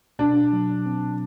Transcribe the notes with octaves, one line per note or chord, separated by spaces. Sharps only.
B2 D4
F#3
C4